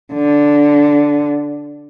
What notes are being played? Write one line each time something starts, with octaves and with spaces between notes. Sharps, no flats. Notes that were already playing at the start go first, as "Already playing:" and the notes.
D3